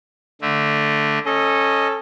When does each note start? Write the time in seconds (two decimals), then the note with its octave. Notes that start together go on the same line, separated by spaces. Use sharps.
0.42 D3 A3
1.25 C#4 A4 D#5